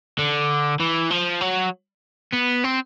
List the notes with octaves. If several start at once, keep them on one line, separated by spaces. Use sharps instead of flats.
D3
E3
F3
F#3
B3
C4